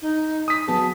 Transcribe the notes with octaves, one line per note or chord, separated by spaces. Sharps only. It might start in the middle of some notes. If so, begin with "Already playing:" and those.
D#4
D#6 B6
F#3 B3 G#4 A5